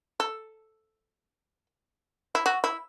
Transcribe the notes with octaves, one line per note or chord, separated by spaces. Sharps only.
A4
E4
F#4
E4